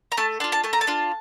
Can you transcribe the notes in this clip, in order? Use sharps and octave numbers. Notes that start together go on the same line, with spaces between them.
A#5
A3 A5
D4 F4 A5
A5
A3 A5
A#5
A5
D4 F4